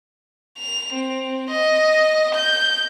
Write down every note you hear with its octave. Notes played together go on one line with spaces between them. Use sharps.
F7
C4
D#5
G6